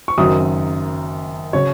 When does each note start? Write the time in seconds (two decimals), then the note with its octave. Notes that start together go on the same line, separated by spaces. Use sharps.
0.08 C#6
0.18 F#1 F#2 D#3 F#3 D#6
1.53 C#3 F#3 C#5